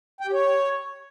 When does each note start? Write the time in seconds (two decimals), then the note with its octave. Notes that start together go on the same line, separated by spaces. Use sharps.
0.21 G5
0.27 G4
0.33 C#5